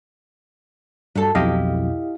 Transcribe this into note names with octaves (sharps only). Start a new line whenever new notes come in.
G2 F#3 A4
B1 F2 B2 E4 G4 D#5 F5